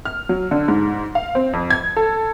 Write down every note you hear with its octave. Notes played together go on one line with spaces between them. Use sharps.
F6
F#3
D3
G#2
F5
C4
F2
G#6
A4